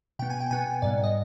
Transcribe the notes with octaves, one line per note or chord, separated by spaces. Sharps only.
B2 B3 G5
G#5
G5
B2 B3 G#5
G#2 G3 B3 D5
D#5